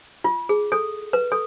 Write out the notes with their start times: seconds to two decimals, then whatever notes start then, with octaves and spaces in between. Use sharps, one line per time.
0.24 F4
0.49 G#4
0.72 A4
1.13 B4
1.32 A4